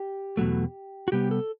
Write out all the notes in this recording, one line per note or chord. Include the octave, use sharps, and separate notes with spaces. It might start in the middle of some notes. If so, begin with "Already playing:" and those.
Already playing: G4
E2 B2 F#3 A3
F#4
C3 G3 B3 G4
A4